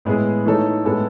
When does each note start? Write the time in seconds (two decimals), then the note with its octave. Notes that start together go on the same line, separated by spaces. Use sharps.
0.05 A2 G#3 B3 E4 G#4
0.45 E3 A3 D#4 A4 C#5
0.85 A2 G#3 B3 E4 A4